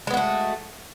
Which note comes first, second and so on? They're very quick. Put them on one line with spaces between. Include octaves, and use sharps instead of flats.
G#3 B3 F#4 A3